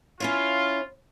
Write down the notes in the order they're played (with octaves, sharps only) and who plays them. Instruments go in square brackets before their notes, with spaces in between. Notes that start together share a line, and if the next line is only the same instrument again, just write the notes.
[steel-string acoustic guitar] C#4 E4 C#5 [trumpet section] F4